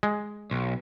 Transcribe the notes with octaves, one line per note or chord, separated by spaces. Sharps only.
G#3
B1